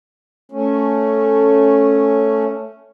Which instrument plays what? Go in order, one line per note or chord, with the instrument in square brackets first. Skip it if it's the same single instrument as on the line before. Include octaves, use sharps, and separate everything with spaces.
[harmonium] A3 C#4